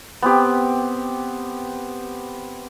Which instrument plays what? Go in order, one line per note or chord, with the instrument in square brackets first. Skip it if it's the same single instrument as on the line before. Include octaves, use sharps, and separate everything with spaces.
[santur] B3 C4 G4